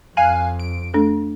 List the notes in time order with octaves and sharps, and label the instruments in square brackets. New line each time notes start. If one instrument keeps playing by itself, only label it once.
[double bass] F2 [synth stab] F5 G#5 F#6
[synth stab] D7
[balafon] A3 D4 A4